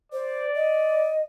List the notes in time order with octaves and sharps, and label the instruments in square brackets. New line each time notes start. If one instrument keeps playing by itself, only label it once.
[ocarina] C5 [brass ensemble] D5
[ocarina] D#5